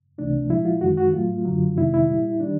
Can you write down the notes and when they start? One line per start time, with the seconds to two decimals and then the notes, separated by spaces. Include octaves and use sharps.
0.18 C#2 C3 E3 A3 D4
0.49 A#2 F3 G#3 E4
0.65 F4
0.81 F#2 D#3 G#3 F#4
0.97 F#4
1.13 A2 F#3 A3 F4
1.45 F#2 D3 F#3
1.77 F2 C3 D#3 G#3 E4
1.94 E4
2.09 A#2 G3
2.40 D#3 G3 D4